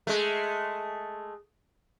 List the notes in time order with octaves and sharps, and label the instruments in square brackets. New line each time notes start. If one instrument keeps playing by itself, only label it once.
[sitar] G#3 A3